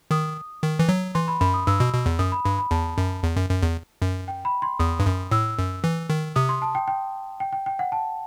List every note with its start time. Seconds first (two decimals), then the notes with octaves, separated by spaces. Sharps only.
0.11 D#3 D#6
0.63 D#3
0.79 E3
0.89 F#3
1.15 E3 C6
1.28 B5
1.41 F#2 B5
1.54 D#6
1.67 G2 E6
1.80 B2
1.93 B2
2.06 E2
2.19 F#2 D#6
2.32 B5
2.45 G2 B5
2.59 B5
2.71 E2 A5
2.98 F#2
3.23 E2
3.37 F#2
3.49 F#2
3.63 E2
4.02 F#2
4.28 G5
4.45 B5
4.62 C6
4.79 E2 D#6
5.00 G2
5.06 F#2
5.31 A2 E6
5.58 F#2
5.84 E3
6.10 D#3
6.36 C3 D#6
6.49 C6
6.62 A5
6.75 G5
6.88 G5
7.40 G5
7.52 G5
7.66 G5
7.79 F#5
7.92 A5